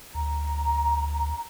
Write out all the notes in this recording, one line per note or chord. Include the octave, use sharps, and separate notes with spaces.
D2 A#5